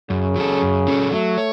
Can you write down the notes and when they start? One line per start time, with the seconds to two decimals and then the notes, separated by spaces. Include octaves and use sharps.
0.10 F#2 C#3
0.36 F#3 C#4 A4
0.61 F#2
0.87 F#3 C#4 A4
1.12 F#3 A3
1.38 C#5